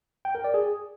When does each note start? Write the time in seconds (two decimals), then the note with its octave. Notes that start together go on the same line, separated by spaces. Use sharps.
0.25 G5
0.35 A#4
0.44 D5
0.54 G#4